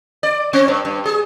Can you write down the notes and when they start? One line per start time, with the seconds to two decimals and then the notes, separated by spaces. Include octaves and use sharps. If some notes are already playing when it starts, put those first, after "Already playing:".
0.23 D5
0.53 C4
0.68 G2
0.85 G2
1.06 G#4